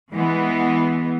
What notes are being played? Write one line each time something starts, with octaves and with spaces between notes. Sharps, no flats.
E3 G#3 B3